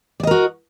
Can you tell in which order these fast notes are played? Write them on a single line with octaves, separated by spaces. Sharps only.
D5 D#5 A#4 F#4